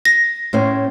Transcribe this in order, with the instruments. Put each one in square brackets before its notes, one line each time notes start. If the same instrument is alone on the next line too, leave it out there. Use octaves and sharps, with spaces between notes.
[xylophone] A#6
[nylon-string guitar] A2 C#4 C5